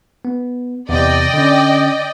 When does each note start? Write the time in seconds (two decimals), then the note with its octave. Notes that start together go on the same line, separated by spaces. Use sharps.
0.25 B3
0.89 E2 C3 D5 D#5 G5
1.34 D3 C#4